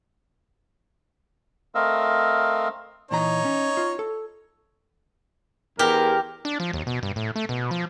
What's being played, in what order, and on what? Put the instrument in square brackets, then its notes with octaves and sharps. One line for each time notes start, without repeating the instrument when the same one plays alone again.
[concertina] A3 C4 A#4 D#5 F5 E6
[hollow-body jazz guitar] A#2 E3 A#5 [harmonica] D#4 C#5
[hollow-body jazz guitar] C#4
F4
A4
[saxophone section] E2 A#4 [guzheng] G4
[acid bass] D4
F3
D#2
B2
G2
A2
A3
B2
F3